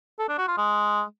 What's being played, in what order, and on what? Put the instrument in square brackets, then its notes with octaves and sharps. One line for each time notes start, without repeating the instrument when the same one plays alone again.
[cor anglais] A4
D4
F#4
F4
G#3